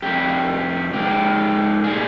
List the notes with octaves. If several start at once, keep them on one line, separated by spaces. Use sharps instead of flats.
F2 C3 G3 G4
G#2 F3 G#3 G4
A#2 G3 G#4